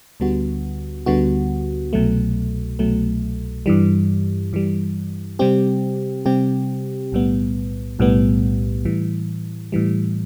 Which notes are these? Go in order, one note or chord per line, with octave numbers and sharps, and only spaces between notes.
D2 D3 G3 B3 F#4
D2 D3 G3 B3 F#4
C2 B2 F#3 A3
C2 B2 F#3 A3
G2 E3 G3
G2 E3 G3
C3 G3 C4 G4
C3 G3 C4 G4
B1 A2 G3 B3
B1 A2 G3 B3
A2 E3 G3
A2 E3 G3